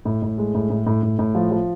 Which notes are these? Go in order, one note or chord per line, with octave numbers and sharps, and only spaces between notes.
A2
A2
G#3
A2
A2
A2
A2
A2
F3
F3